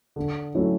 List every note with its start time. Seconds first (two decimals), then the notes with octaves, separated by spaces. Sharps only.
0.16 D3
0.54 F#3 A3 C#4 E4